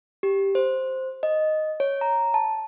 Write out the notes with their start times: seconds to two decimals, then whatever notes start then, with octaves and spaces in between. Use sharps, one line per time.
0.23 G4
0.55 C5
1.23 D#5
1.80 C#5
2.01 A#5
2.34 A5